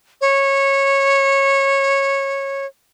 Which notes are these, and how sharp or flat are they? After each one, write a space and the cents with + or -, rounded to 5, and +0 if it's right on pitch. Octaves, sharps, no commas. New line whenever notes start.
C#5 -15